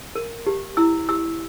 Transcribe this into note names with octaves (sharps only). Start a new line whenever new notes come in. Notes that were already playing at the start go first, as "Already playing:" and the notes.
A#4
G4
E4 E6
G4 E6